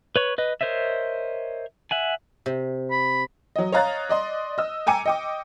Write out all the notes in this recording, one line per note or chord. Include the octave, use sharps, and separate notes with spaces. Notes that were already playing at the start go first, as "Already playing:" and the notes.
B4 C#5 C#6
B4 D#5
A#4 C5 C#5 D#5 E5
E5 F#5 G#5
C3
B5
F#3 D#5
C#5 D#5 F5 A#5 F#6 A6
D5 D#5 C6
D#5 E6
G5 G#5 A#5 D6 C#7 D#7
D#5 G5 D6